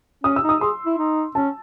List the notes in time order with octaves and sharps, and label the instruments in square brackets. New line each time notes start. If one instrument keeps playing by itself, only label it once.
[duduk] C#4 [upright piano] D#6
[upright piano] E6
[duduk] D#4
[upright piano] D#6
[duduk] G#4 [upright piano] C6
[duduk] E4
D#4
[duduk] C#4 [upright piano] A5